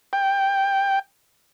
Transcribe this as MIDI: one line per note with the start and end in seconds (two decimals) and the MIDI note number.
0.13 0.99 79